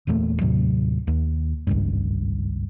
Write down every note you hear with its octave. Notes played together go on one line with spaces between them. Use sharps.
E1 E2 A#2 A3
D#2 A2 C3 F#3
D#2
G#1 C#2 G2